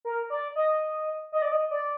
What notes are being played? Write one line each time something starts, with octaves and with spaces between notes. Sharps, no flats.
A#4
D5
D#5
D#5
D5
D#5
D5